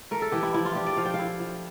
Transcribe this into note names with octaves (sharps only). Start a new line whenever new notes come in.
A3 A#4
A4
E3 G4
E4
F3 E4
F4
D4 G4
D5
F3 F5
G5
F5
E4
F3